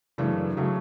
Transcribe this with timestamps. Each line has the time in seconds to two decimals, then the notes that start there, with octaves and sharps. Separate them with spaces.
0.18 F#2 C#3 E3 A3 D4
0.57 C#3 F#3 A3